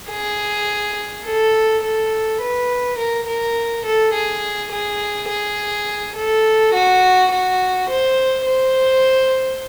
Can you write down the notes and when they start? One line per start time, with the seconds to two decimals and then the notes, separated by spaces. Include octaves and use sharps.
0.10 G#4
1.25 A4
1.83 A4
2.41 B4
2.98 A#4
3.27 A#4
3.85 A4
4.14 G#4
4.72 G#4
5.29 G#4
6.16 A4
6.74 F#4
7.32 F#4
7.89 C5
8.46 C5